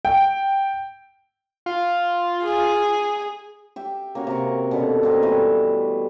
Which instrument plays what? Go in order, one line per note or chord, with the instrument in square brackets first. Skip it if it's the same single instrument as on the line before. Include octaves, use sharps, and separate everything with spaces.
[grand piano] G5
[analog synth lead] F4
[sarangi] G#4
[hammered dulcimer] G4 E5
A#3 C#4 F#4 F5
C3 A#4 C#6
B2 D3 C#4 A4
A#3 C4 D#5
B2 E3 G3 A3